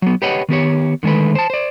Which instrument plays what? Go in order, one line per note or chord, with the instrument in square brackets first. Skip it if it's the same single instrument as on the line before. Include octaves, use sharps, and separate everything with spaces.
[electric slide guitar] F#3 B3
G4 B4 C#5 D#5 F#5
D#3 B3 G4 C#5
D3 D#3 G#3 A3 B4
C5 A5
C5 D5